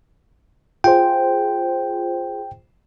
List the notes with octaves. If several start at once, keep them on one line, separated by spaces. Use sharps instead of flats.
F4 G#4 C5 G5